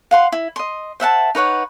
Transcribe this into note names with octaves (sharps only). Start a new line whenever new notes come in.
F5 F#5 C6
E4
D#5 C6
C5 E5 F#5 A5
D#4 B4 C#5 F#5